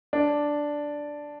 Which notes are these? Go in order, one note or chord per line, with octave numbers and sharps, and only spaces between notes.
D4